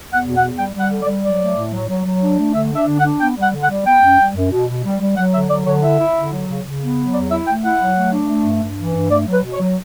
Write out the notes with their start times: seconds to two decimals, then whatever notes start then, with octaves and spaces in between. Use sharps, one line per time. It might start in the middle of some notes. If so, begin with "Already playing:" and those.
0.09 E2
0.14 F#5
0.25 B2
0.36 F#5
0.41 E2
0.57 G3 G5
0.74 G3
0.80 F#5
0.90 D3
1.02 D5
1.07 G3
1.23 F#3 D5
1.40 A3
1.56 A2
1.72 F#3
1.89 F#3
2.05 F#3
2.21 D4
2.38 A3
2.54 D3 E5
2.70 D4
2.76 E5
2.87 D3
2.98 F#5
3.04 D4
3.20 B3 G5
3.36 G3
3.42 F#5
3.53 D3
3.63 F#5
3.70 G3
3.86 B3 G5
4.02 F#2
4.19 G3
4.35 F#2
4.51 B2
4.68 B2
4.84 G3
5.00 G3
5.17 F#3 F#5
5.33 D3 E5
5.49 F#3 D5
5.66 D3 C#5
5.82 E4 E5
5.99 E4
6.15 D3
6.32 F#3
6.48 C#3
6.64 C#3
6.81 B3
6.97 F#3
7.14 E2 D5
7.30 E4 E5
7.46 A3 G5
7.63 E4 F#5
7.80 F#3
7.96 A3
8.12 D4
8.28 A3
8.45 G2
8.62 G2
8.78 E3
8.94 G2
9.10 A3 D5
9.27 F#3
9.32 B4
9.43 B2
9.53 C#5
9.59 F#3